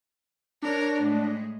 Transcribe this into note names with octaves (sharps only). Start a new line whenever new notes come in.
D4 A#4 C#5
A2 G#3